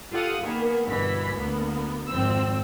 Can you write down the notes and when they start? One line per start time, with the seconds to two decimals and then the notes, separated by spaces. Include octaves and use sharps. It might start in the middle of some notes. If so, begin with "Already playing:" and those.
0.11 F4 G4 A4 F5 F#5 D#6
0.42 D#3 A#3 B3 G#4
0.86 G1 B2 E3 B6
1.35 D2 A#3 B3
2.09 G#1 F2 C4 E6